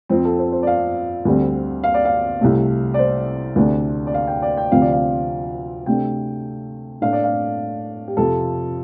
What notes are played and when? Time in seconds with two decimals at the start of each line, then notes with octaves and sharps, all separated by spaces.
0.09 F2 F3 C4 C5
0.25 A4
0.39 C5
0.53 C5
0.63 D5
0.67 F5
1.25 D2 D3 G3 C4
1.84 F5
1.94 D5
2.05 F5
2.41 C2 C3 A3
2.94 D5
2.99 C5
3.56 D2 C3 A3 D4
4.07 D5
4.14 F5
4.28 G5
4.42 D5
4.57 G5
4.71 D2 C3 F3 C4 F5
4.82 D5
4.92 F5
5.86 C3 A3 D4 G5
7.02 A2 A3 D4 F5
7.13 D5
7.24 F5
8.08 G4
8.17 F2 C3 F3 A4